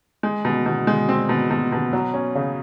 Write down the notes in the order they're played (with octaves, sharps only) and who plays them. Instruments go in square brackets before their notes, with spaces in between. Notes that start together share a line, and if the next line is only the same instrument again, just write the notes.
[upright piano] G#3
B2
B2
G#3
C4
B2
B2
B2
F#3
C#4
C#3